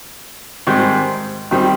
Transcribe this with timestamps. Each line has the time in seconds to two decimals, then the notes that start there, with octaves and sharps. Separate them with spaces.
0.67 G#2 D#3 G3 C4
1.51 D#3 G3 C4